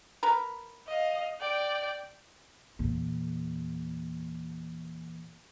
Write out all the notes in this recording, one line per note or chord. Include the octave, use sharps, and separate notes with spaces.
A#4 B4
D#5 F5
D5 G5
E2 A#2